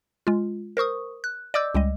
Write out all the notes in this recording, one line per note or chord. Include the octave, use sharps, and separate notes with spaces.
G#3 F4
A#4 C5 C#6 D#6
F#6
D5 D#5 D6 E6 G6
C#2 G3 G#3 D#5